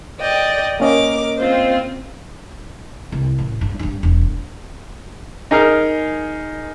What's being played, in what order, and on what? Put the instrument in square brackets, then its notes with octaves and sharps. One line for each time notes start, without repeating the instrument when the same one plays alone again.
[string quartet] D5 D#5 G5
[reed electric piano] A#3 C#4 D#5 [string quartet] A#4 D6
[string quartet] C4 F4 C5
[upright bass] C2
A1
G2
G2 D4
E1
[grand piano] D#4 G#4 A#4 F6